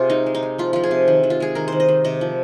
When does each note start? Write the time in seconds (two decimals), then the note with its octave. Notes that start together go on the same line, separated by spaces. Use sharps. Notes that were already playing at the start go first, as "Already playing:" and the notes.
Already playing: C3 F4 G#4
0.10 G#3 D#4
0.26 G#3
0.35 D#4
0.43 G#3
0.58 F3 F4
0.73 F3 F4
0.83 G#4
0.91 C3
1.08 D#3
1.23 D#3
1.30 F4
1.40 G#3 G#4
1.55 D#3 A#4
1.68 D#3 C5
1.80 D#5
1.89 D#3
2.05 C3 D#5
2.21 F3